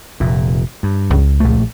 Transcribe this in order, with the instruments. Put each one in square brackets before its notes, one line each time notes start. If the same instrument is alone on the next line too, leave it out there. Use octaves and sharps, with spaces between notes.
[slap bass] F1 A#2
G2
[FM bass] C#2
[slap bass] A#1 A3